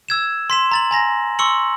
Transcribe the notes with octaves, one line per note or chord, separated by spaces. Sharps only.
E6 G#6 E7
C6 B6 E7
A#5 A6 F#7
G#5 A#5 A#6
C6 C#6 E6 C#7 F#7